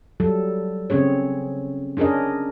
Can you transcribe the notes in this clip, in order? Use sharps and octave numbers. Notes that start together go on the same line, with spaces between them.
F#3 G3 A4
C#3 C4 C#4 G#4 C#5
C#4 D4 G#4 A#4 D#5